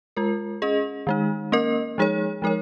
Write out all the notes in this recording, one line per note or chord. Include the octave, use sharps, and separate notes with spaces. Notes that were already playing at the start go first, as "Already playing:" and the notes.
G#3 F4 A#4
C#4 G#4 D#5
D#3 G#3 D#4
A#3 C#4 A#4 D#5
F3 G#3 D#4 G#4 C#5
F3 G#3 D#4 A#4 C#5